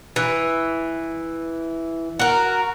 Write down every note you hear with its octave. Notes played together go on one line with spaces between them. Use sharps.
E3
F#4 A#4